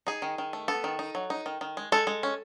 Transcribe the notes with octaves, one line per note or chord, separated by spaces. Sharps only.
D#4 G#4
D#3
D#3
A3
B3 A4
D#3
D#4
F#3
D#4
D#3
D#3
G#3
G#3 A4
G#3
C#4